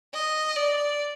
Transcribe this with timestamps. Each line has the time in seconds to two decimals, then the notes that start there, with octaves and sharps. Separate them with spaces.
0.14 D#5
0.56 D5